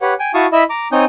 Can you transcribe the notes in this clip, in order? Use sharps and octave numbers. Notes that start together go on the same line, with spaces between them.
G4 B4 C#5 F#5
G5 G#5
E4 F#4 F5 A5 C#6 D#6
E4 D#5 E5 B5 E6
A#5 D6
C4 D#4 C#5 G#5 D#6 G6